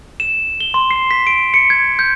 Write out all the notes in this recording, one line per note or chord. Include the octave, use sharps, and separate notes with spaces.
E7
G7
C6
C7
B6
D7
C#7
G#6
G6